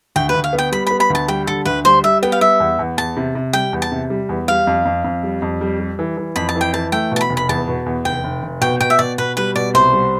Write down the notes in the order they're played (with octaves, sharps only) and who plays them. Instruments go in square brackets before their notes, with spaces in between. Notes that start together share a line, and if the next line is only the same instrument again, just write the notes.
[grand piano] D2 [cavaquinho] G5
[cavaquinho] B4
[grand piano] D2
[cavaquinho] F5
[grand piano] B3
[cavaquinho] G5
[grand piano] G3 [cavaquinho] B5
[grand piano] B3 [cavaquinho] B5
[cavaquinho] B5
[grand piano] D2 [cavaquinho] A5
[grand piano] G3 [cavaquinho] G5
[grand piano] D3 [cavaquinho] A4
[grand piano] D2 [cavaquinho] B4
[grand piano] G3 [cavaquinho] C5
[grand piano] G3 [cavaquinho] E5
[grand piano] B3 [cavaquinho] G5
[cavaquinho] F5
[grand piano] G3 [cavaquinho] E5
[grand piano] E2
E2
[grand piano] E2 [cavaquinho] A5
[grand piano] C3
C3
[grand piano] G3 [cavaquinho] G5
[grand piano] E2
[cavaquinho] A5
[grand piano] C3
G3
E2
[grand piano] G3 [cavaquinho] F5
[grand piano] F2
F2
F2
G3
F2
G3
G3
E3
E3
[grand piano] F2 [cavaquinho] B5
[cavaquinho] A5
[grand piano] E3
[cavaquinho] G5
[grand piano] E3 [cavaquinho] A5
[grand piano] A3 [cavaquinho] G5
[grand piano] B2 [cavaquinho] A5
[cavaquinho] B5
[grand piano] F1
[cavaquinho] B5
[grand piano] E2 [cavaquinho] A5
[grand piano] B2
E2
[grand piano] F1 [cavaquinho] G5
[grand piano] F1
F1
[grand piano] B2 [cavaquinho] G5
[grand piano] B2 [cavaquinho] G5
[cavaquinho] E5
[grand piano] B2 [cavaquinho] D5
[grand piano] B2 [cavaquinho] B4
[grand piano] G3 [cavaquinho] B4
[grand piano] B2 [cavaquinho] D5
[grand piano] C2 [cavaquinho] C5
[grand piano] G3